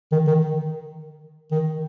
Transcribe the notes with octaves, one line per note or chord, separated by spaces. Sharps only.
D#3
D#3
D#3